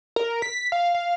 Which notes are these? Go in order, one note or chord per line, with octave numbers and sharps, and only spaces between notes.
A#4
B6
F5
F5